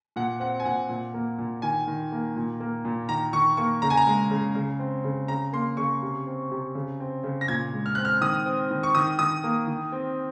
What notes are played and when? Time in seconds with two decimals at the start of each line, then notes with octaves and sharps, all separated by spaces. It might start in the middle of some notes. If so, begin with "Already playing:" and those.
0.16 A#2 F#5
0.40 C4 F#5
0.60 G#5
0.65 A#2 F#5
0.89 A#2
1.14 A#3
1.38 A#2
1.62 D#3 G#5
1.87 D#3
2.12 A#3
2.36 A#2
2.60 A#3
2.85 A#2
3.09 D#3 A#5
3.33 D#3 C#6
3.57 A#3 C#6
3.82 C#3 A#5
3.90 G#5
3.97 A#5
4.07 G#3
4.31 C#3
4.55 C#3
4.79 C4
5.04 C#3
5.28 C#3 A#5
5.53 A#3 C6
5.77 C#3 C#6
6.02 C3
6.27 C4
6.51 C3
6.75 C#3
7.00 C4
7.24 C#3
7.41 A#6
7.48 A#2 G#6
7.73 G#3
7.86 F6
7.95 C4 F#6
8.05 F6
8.21 D#3 D#6
8.46 C4
8.71 D#3
8.83 C#6
8.95 D#3 D#6
9.19 D#3 D#6
9.44 A#3
9.68 D#3
9.92 C4